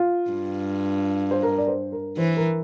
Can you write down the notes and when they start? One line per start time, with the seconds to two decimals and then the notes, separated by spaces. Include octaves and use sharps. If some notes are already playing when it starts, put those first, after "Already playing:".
Already playing: F4
0.30 G2
1.31 C5
1.43 A#4
1.58 D5
1.68 C5
1.92 A#4
2.17 E3 C5
2.37 A#4